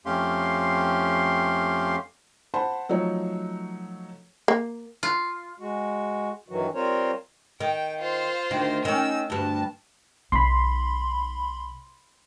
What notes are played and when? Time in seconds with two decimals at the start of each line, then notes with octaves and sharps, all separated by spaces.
0.06 F2 A3 C#4 G4 F5 C6
2.54 C5 F#5 A5 B5 C6
2.89 F3 F#3 A3 D#4 C#5
4.48 A#3
5.03 F4
5.59 G#3 F#4
6.49 G2 D#3 E3 F#3 F#4
6.74 G3 C4 F4 A#4 C5 C#5
7.60 D#3 G5
7.99 F4 C5
8.51 D2 D#3
8.85 D#3 C#4 E6
9.30 D2 G2 A5
10.32 B1 D#4 B5 C6